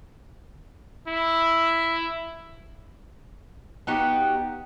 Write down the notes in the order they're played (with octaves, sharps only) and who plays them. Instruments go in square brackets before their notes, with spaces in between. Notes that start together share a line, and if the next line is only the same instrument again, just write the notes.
[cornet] E4
[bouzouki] B3 D#4 F#4 G4